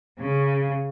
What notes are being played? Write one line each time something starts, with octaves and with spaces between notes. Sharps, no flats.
C#3